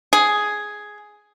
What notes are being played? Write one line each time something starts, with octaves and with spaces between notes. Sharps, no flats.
G#4